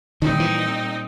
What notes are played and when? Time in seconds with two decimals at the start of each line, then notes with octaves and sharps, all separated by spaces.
0.22 A#2 D#3 G3 C4 D#4
0.40 E3